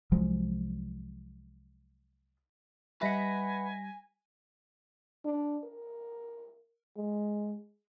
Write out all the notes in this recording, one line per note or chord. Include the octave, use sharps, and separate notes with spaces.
C2 F3 F#3 G#3
G3 B4 D#5 E5 F#5 G#5 A#6 B6
D4
A#4
G#3